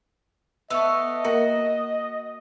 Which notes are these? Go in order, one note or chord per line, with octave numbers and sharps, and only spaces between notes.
A3 B3 D#5 C#6 E6
A#3 F#4 A#4